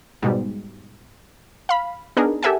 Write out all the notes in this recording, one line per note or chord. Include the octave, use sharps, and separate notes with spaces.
G#2 B2 G3
F5 B5
B3 D4 D#4 G#4 A#4
G4 A4 A#4 E5 F#5 G#5